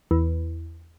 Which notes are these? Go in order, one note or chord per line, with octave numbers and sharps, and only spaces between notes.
E2